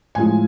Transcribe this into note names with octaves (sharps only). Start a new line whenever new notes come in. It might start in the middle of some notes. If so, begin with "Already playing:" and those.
A2 F3 G#3 G#5